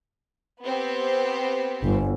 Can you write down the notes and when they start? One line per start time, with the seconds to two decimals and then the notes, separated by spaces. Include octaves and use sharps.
0.62 B3 C4 G4
1.83 G1